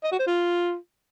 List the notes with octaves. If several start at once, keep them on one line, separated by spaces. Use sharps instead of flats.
D#5
F#4
C5
F4